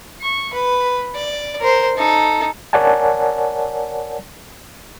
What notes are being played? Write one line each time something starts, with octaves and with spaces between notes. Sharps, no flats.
C#6
B4
D5
A#4 C5
D#4 A4
A#4 C#5 D5 F#5 G#5 A5